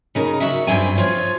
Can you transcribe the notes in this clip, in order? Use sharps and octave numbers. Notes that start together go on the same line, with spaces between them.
C#3 D#4 A#4
F#4 E5
G2 C4 G#5
F3 F4 C#5